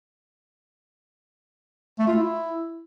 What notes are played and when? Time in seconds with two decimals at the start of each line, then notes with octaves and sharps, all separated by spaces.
1.99 A3
2.07 F4
2.16 E4